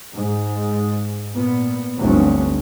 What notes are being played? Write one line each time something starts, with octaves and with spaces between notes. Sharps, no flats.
G#2
A#2 B3
G1 D2 G2 F#3 C4 C#4